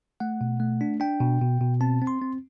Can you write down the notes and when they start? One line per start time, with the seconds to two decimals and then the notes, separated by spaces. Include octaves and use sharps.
0.20 A3 F#5
0.41 B2
0.60 A3
0.81 D4
1.00 D4 G5
1.20 B2
1.41 B2
1.61 B2
1.81 C4 A5
2.02 C4
2.07 C6
2.22 C4